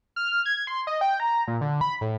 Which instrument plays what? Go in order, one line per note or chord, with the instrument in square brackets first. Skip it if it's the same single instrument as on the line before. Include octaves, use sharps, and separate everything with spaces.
[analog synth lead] F6
G#6
C6
D#5
G5
A#5
A#2
D3
B5
A2